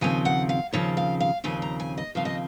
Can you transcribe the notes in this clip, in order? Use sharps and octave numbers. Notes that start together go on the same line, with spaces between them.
D#2 C#3 F3 C4 G#5
F#5
F5
D#2 C#3 F3 C4 C#5
F5
F5
D#2 C#3 F3 C4 G#5
A#5
G#5
D#5
D#2 C#3 F3 C4 F5
D#5